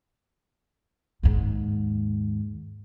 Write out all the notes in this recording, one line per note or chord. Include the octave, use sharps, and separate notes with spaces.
D#2 G#2